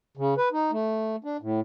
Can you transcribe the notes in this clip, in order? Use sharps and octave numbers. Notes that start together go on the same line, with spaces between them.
C#3
B4
D#4
A3
D4
A2